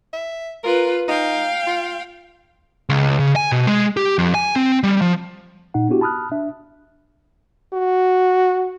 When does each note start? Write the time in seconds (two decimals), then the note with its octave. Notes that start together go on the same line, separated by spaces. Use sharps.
0.13 E5
0.64 F4 A#4 B4
1.08 D#4 F5 G5
1.67 F4
2.89 C#2
3.20 C#3
3.36 G#5
3.52 B2
3.67 G#3
3.97 G4
4.18 F2
4.35 G#5
4.56 C4
4.83 G3
5.02 F3
5.74 A#2 D#4 F#5
5.89 B3 D4 E4 F#4 G4
6.01 A5 B5 D#6 F6 F#6
6.32 D4 E5
7.74 F#4